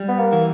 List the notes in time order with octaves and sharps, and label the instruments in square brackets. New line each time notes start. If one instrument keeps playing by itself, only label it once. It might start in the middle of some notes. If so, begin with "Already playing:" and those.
Already playing: [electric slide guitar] G3
[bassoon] B3
A#3
[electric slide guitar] E3